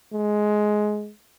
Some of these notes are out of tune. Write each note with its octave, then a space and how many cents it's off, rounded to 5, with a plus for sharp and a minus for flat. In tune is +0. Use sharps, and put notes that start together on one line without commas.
G#3 +15